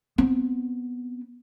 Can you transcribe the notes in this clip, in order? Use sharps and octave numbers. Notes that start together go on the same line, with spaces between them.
B3 C4